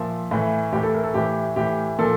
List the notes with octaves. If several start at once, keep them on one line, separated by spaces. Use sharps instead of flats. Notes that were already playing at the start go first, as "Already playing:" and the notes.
Already playing: A#2 F3 E5
A2 E3
A2 E3 G4
A4
A#4
A4
A2 E3 G4
A2 E3 G4
A#2 F3 A4